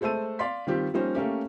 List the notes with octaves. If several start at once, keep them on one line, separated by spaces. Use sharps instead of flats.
G#3 A3 C5 A5 E6 D#7
D5 F5 C6 B6
D#3 G3 C4 F4 G4
F3 G3 A#3 C#4 D#4 C5
A3 A#3 C#4 G4